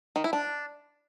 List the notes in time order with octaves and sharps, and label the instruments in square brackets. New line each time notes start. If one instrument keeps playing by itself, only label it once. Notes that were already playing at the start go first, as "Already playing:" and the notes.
[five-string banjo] D#3
E4
D4